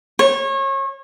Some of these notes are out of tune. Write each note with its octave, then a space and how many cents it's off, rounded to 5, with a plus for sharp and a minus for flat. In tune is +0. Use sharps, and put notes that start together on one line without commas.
C#5 -30